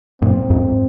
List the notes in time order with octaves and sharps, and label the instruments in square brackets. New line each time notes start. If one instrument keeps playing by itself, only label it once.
[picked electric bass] F#2 A#2 [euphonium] C4
[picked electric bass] F2 G#2